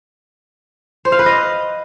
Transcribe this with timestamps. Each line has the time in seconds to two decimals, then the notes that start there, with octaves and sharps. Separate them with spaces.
1.05 C5
1.12 F5
1.19 B4
1.26 D#5